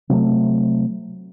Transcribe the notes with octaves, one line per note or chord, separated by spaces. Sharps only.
C3 F#3 A3